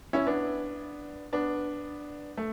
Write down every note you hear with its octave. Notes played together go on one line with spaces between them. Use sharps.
C#4 E4
B3 D4
B3 D4
A3